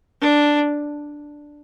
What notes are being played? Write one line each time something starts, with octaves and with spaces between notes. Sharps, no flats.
D4